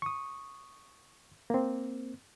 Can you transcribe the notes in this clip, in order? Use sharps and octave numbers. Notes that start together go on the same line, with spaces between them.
C#6 D#6
A#3 C4